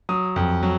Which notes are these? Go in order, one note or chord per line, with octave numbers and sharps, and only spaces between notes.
F#3 D#6
F2
F#3